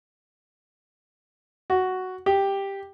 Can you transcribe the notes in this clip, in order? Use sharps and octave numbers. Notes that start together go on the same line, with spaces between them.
F#4
G4